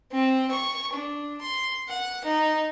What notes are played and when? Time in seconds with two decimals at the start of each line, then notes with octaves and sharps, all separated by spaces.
0.12 C4
0.51 C#6
0.93 D4
1.41 C6
1.88 F#5
2.24 D#4